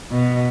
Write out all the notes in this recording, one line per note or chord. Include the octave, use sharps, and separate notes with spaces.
B2